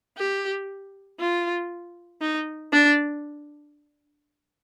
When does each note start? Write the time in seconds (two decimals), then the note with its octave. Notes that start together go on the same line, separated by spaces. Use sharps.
0.17 G4
1.19 F4
2.21 D#4
2.72 D4